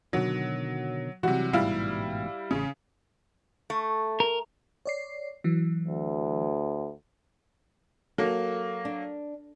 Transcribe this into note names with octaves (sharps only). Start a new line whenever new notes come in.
B2 D3 D#3 F#3
C3 E3 F#3 G3 F#4
A1 G#2 B2 G3 E4 F5
A1 C#3 C#4
A3
A#4
C#5 D5 C7
E3 F#3
D2
F#3 A#3 A4
D4